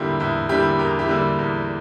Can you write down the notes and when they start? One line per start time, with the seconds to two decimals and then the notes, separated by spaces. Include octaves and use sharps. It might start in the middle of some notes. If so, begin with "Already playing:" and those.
Already playing: E2 D3 G3 A#3 E4 F4 G4
0.20 E2 E4
0.49 D3 G3 A#3 E4 G4
0.79 E2 G4 A#4
0.99 E4 G4
1.08 D3 G3 A#3
1.39 E2